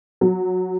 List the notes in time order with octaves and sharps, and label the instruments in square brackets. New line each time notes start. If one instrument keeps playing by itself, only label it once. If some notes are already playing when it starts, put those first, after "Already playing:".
[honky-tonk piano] F#3